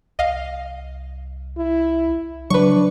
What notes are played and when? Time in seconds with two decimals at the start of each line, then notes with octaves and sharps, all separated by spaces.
0.19 C2 D#5 F5
1.57 E4
2.50 C#3 F#3 D4 B4 C#6